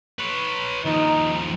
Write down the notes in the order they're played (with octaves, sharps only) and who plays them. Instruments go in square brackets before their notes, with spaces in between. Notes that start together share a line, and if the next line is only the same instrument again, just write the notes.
[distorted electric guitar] B4 C#5
[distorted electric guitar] D#2 F3 [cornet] D#4